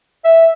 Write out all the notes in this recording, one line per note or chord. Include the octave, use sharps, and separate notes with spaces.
E5